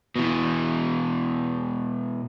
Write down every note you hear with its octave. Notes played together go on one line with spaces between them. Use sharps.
B2 E3